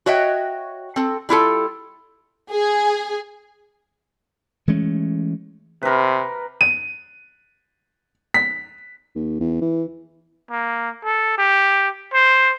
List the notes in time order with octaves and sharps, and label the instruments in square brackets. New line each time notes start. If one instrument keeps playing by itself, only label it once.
[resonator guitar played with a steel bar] F#4 C#5 D#5 E5 G5
C4 A4
G3 E4 F4 A4
[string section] G#4
[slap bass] E3 G#3 A3 C#4
[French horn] C3 [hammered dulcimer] A#4 B4
[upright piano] D#7
B6
[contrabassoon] D#2
E2
E3
[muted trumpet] A#3
A4
G4
C5